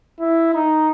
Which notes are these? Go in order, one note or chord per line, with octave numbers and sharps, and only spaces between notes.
E4
D#4